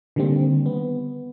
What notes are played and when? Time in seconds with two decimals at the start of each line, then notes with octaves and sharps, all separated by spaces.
0.16 D3 D#3 G3 A#3 C4
0.66 B3